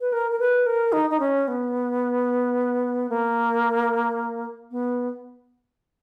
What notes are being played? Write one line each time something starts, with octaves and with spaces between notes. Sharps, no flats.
B4
A#4
A#4
B4
A#4
D#4
D#4
C#4
B3
A#3
B3